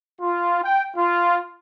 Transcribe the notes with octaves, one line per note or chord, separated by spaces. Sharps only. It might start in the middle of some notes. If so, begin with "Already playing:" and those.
F4
G5
F4